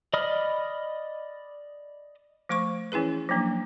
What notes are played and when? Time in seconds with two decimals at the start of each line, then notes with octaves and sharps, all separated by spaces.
0.13 D5 D#5 B5 D#6 F6
2.49 F3 A3 C5 C#6
2.92 E3 C#4 E4 G#4 B4
3.29 F3 F#3 A#3 D4